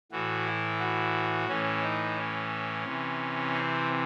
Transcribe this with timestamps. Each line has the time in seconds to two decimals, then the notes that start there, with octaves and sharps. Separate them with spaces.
0.12 A2 E3 F#4
0.46 E4
0.80 F#4
1.48 A2 E3 C#4
1.82 D#4
2.17 C#4
2.84 C3 E3
3.53 C4